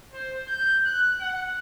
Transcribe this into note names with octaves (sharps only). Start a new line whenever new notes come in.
C5
G6
F#6
F#5